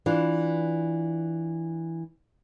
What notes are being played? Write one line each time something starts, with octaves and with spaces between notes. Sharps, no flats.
E3 D4 F4